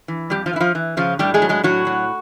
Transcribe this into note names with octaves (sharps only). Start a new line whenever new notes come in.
E3
F2 G3 G4
F3 F4
E3
E4
F3 F4
E3
C#3 F3 F4
A2 G3 G4
G#3 G#4
F#3
G#3 G#4
A2 F#3 F#4
F#3